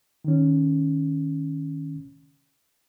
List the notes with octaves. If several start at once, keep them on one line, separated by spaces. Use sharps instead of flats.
D#3 C#4